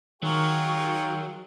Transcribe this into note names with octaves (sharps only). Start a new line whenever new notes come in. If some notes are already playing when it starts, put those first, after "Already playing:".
D#3 F#3 F4 G#4 A#4 G5 C#6